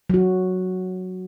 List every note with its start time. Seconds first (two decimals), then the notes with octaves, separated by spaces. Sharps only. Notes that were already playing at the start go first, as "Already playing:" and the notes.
0.10 F#3 F#4